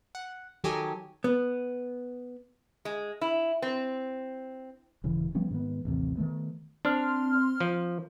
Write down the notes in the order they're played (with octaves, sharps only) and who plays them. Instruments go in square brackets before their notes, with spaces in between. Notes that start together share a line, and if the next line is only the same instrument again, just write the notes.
[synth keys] F#5
D#3 F#3 G4 A4 D#5 G#5
[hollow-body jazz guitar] B3
[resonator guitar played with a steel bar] G#3
E4
C4
[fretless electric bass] D#1 C#3 E3
F3 G3 B3 C#4
G#2 D#3 B3
A1 D#2 C3
D#3 F#3 A3 B3
[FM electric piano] C4 C6 F6 [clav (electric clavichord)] D4
[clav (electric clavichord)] F3